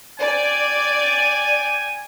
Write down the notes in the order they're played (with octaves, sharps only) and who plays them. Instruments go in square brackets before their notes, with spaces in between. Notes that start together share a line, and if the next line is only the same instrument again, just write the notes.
[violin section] D5 [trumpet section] G5 G#5